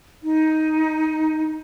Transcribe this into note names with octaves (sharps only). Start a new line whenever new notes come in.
D#4